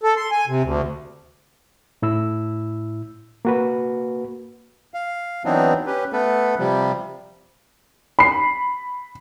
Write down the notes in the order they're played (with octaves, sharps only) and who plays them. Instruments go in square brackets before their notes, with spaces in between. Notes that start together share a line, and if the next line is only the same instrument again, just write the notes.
[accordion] A4
C6
G#5
C3
D2
[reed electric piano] A2 E4 E6
A#3 F#4 B4
[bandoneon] F5
E3 F#3 B3 C4 D4 D#4
C#4 G4 B4
A3 B3 A4 B4
C3 F3 G3
[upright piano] B5 C7